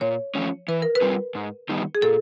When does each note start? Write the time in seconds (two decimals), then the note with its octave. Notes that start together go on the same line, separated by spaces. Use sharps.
0.01 A#2 C#5
0.35 F3 A3 C#4
0.68 E3 B4
0.82 A#4
0.95 B4
1.01 G3 C4 F4 G#4
1.35 G#2
1.69 D#3 G3 B3 D#4
1.95 G#4
2.02 A#2 A4